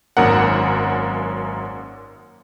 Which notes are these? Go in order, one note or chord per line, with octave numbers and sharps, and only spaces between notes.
G#1 F#2 A#3 A#4 F#5